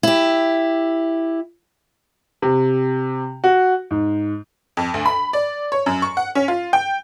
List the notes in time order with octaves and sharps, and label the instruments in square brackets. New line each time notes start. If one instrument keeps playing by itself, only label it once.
[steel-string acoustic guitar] E4 G4
[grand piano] C3
F#4
G#2
[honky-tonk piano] F2
D2
B5
D5
C#5
F#2
C#6
F#5
C#4
F4
G5